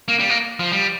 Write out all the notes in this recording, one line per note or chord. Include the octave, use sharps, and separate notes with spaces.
A#3
G3
A#3
F3
G3